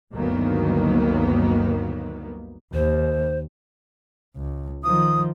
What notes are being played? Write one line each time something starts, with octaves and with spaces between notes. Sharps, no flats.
G1 D2 D#3 F#3 A#3 B3
D#2 C5
C#2
D#3 F3 D#6